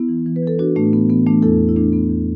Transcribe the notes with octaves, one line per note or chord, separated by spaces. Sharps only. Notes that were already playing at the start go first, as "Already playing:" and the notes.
Already playing: B3 E4
E3
E3
B4
E3 A4
E3 D4 F#4
A2 A3 D4
E3 B3
E3 B3
E3 A3 D4
E2 E4 A4
E2
E4
E3 A3 D4
E2 B3
E2